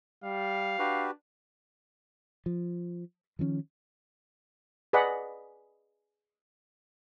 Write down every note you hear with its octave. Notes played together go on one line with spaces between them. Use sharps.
G3 F5
D4 F#4 G4 B4
F3
D#3 F3 C4 C#4
G#4 B4 D5 D#5 F#5 B5